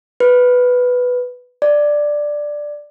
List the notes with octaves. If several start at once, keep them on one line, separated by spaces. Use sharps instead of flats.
B4
D5